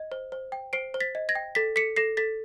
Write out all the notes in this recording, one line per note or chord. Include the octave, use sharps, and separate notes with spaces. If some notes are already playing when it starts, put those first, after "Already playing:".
Already playing: D#5
C5
C5
G5
C5 C7 D7
C5
A6 B6
D#5
G#6 A#6
G5
A4 A6 B6
A4 B6 C#7
A4 A#6 C7
A4 A6 B6